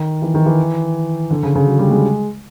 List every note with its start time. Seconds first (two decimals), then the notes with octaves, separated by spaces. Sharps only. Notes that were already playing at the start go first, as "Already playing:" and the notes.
Already playing: D#3
0.22 E3
0.34 D#3
0.46 E3
1.31 D3
1.43 C#3
1.55 C#3
1.67 F#3
1.79 G3
1.90 G#3